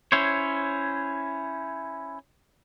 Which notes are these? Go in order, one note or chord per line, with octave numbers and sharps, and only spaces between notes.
C#4 E4 C5 C#5